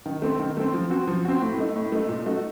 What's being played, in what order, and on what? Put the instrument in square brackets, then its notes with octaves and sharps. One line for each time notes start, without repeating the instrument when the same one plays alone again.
[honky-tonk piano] D#3
A3 C4
D#3
A3 C4
F3
C4 F#4
F3
C4 F#4
A2
A3 D#4
A2
A3 D#4
A#2
A3 D#4 F#4